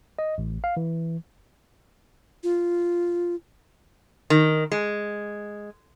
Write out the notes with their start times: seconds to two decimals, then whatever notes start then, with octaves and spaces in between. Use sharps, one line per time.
0.19 D#5
0.38 A1
0.64 F5
0.77 E3
2.43 F4
4.30 D#3
4.72 G#3